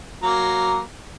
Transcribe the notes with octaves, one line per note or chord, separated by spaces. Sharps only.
F#3 A#3 A#5